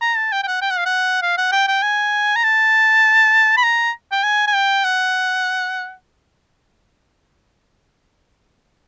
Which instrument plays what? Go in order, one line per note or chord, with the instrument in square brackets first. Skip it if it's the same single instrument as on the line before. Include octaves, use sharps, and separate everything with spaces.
[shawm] A#5
A5
G5
G5
F#5
G5
F#5
F5
F#5
F5
F#5
G5
G5
G#5
A#5
A5
B5
A#5
G5
G#5
G#5
G5
F#5